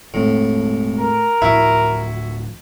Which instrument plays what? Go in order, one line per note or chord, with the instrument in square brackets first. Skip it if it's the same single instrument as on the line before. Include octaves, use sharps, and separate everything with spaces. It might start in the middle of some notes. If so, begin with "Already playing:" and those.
[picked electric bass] E1 G#3 C4 [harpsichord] A2
[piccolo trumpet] A#4
[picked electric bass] D1 A2 F3 [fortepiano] E4 [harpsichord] F#4